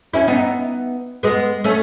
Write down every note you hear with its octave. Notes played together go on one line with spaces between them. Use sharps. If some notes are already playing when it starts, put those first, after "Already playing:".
C#4 E4
B3 D#4
G#3 B3
A3 C#4